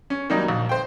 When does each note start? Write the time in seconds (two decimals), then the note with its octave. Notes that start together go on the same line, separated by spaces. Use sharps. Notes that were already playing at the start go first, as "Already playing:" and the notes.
0.10 C#4
0.30 D#3 F#3 G3 A#3 D#4
0.48 A#1
0.69 C5 G5